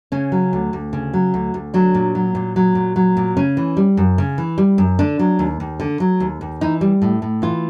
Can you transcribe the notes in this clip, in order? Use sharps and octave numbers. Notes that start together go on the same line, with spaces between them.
C#3 C#4
F#3
D2
D2
C#3
F#3
D2
D2
F#3 D4
A#2
F#3
A#2
F#3
A#2
F#3
A#2
C#3 C#4
E3
G3
F#2
C#3
E3
G3
F#2
D3 D4
F#3
D#2
D#2
D3
F#3
D#2
D#2
E3 D#4
G3
A2
A2
E3 F4